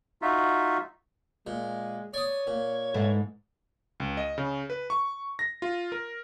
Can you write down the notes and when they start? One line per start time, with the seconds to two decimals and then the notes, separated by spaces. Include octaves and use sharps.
0.22 D#4 F4 F#4 E5
1.47 A#2 G#3
2.14 C#5 D5 D#6
2.47 A#2
2.94 G#2 E3 A3
4.00 C#2
4.17 D#5
4.38 C#3
4.70 B4
4.90 C#6
5.39 A#6
5.62 F4
5.92 A#4